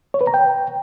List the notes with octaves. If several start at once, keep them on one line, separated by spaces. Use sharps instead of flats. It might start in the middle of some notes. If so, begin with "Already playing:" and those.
C#5
B4
A#5
G5